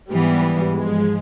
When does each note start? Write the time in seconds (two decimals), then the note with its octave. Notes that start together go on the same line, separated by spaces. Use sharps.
0.11 G#2 E3 G3 B3
0.75 G#2 F3 G#3